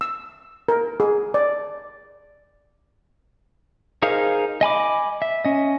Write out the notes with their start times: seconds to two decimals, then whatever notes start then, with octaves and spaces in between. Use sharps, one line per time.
0.01 E6
0.68 A#4
1.00 G#4
1.34 D5
4.02 D#4 G#4 A#4 C5 F5
4.61 D#5 G#5 B5 D6
5.22 E5
5.45 C#4 D#5